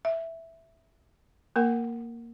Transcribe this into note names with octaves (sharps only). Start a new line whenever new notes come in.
E5
A#3 A#4 F#5